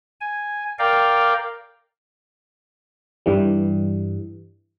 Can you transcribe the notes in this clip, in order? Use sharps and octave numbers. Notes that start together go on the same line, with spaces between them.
G#5
A#4 D5 F5 G5
G2 E3 G3